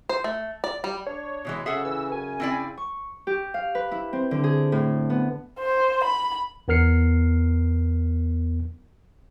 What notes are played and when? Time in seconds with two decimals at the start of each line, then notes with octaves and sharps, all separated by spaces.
0.09 C5
0.24 A3
0.64 D5
0.84 G3
1.07 D4 C#5
1.45 B2 E3 F#3 G#3
1.66 C#3 C#4 G#4 A4 E5 F#5
1.85 E3 E6
2.12 F#2 G#5
2.40 C4 E4 D5
2.77 C#6
3.27 G4
3.54 F5
3.75 B4
3.91 E4
4.13 C4
4.31 D3
4.44 G#4
4.72 A2
5.10 B3
5.59 C5
6.04 B5
6.68 E2 B3 A#4 F6 C7 C#7